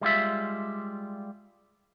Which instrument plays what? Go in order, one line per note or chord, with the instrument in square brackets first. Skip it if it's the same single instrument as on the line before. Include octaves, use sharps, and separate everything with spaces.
[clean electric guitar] G3 G#3 F4 E5